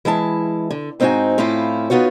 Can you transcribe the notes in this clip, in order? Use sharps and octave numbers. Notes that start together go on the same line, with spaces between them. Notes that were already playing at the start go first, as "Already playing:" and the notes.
E3 G#3 E4 A5
D3
G#2 C4 D#4 F4 F#4 G#5
A2 C4 C#4 E4 F4 F5
B3 D#4 F4 F#4 C#5